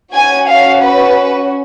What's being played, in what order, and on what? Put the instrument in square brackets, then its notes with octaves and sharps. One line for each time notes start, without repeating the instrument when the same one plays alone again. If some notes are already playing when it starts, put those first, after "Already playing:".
[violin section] C#4 F#4 G#5
F5
B4